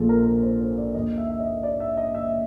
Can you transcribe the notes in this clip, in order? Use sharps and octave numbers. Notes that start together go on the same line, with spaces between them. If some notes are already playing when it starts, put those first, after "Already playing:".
Already playing: A#1 A#2 F3 G#4 A4
A#4
A#4
C5
C5
D5
D#2 D#3 D#5
E5
E5
D#5
D5
E5
D#5
E5